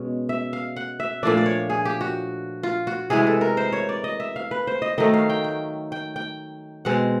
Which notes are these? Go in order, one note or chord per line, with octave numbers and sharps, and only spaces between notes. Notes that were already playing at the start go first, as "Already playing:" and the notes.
Already playing: B2 G#3 C#4
E5
F5
F#5
E5
A#2 F3 A3 D4 D5
D5
C#5
G#4
G4
F#4
F4
F#4
C3 E3 G#3 G#4
A4
A#4
C5
C#5
D5
D#5
E5
F5
B4
C5
D#5
D#3 F#3 A3 D#5
F5
G5
G5
G5
G5
B2 G#3 C4 F#5